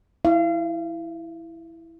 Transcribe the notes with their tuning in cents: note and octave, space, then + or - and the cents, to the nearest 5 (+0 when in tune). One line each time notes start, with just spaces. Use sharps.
E4 +0 F5 -35